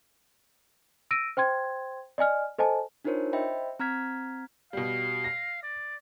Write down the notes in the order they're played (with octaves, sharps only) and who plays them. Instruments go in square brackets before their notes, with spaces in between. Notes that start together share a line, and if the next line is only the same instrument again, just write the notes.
[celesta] E6 A#6 D7 D#7
C5 G5 C6 G#6
D5 D#5 G#5 F6
A4 C5 D#5 G#5 A5
[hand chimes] D4 D#4 F4 A#4 C5 C#5
C5 D#5 E5 G5 B5
C4 A#5 F6 G#6 B6
[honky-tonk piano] B2 G3 [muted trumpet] F5
[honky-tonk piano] A#6
[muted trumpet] D5